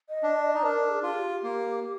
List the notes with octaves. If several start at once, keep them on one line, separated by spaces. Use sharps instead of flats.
D#5
D4
D5
D#5
D#4 D5
D4 A#4
G#4
F4
G#4
G4
A#3